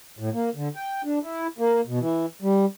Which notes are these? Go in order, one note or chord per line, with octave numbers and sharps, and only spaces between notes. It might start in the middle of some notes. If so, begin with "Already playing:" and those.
A2
A#3
D3
G5
D4
E4
A#3
B2
E3
G3